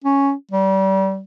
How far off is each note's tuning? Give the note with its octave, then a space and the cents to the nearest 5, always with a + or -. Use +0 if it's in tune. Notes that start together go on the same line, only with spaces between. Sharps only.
C#4 +0
G3 -30